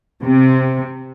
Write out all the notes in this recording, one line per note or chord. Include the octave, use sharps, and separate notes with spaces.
C3